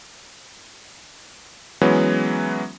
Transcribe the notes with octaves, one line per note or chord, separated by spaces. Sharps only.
E3 F#3 G#3 B3 C#4